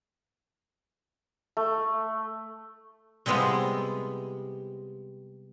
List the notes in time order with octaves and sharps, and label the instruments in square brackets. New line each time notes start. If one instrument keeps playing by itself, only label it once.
[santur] A3
[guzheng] C3 G3 G#3 B3 E4 F4